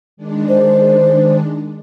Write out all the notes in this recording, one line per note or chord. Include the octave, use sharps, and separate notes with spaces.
D#3 G#3 D4
C5